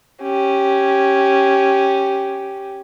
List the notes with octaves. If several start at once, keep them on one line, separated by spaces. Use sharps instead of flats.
C#4 G4